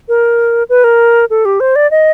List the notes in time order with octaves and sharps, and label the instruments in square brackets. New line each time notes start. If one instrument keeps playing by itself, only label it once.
[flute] A#4
B4
A#4
A4
G4
C5
D5
D#5